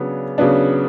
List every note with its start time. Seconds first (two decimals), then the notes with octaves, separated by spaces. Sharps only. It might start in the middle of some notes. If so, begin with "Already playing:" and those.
Already playing: C#3 F#3 B3 D4
0.38 C#3 F#3 B3 D4